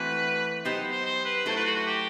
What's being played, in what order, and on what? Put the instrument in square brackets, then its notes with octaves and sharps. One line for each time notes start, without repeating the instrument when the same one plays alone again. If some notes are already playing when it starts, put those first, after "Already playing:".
Already playing: [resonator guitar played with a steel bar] E3 A3 C4 F#4 [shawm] B4
[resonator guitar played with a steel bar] F#3 B3 D#4 G4 [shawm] C5
[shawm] C5
C5
B4
[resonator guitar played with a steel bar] F#3 A3 E4 A4 [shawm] C5
[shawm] B4
F#4
F#4
G4